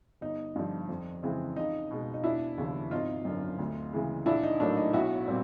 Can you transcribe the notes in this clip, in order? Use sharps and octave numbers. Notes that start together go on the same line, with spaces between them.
G1 D#4
G2 D3 F3
F2
C#3 E3 G#3 C4
C#2 D#4
B2 G#3
D#4
E1 D4 E4
D#2 C#3 F3
G#1 D#4 F4
F#2 D3
D2
C#3 E3 G#3
A#1 D4 E4
D#4
A2 F#3 A#3 D4
D#4
B1 E4 F#4
A#2 G3 C4